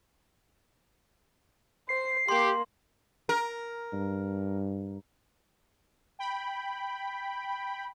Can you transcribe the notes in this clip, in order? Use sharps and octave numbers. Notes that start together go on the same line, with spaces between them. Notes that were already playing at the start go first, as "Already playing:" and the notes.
C5 C7
A#3 G4 C6
A#4
G2
G5 B5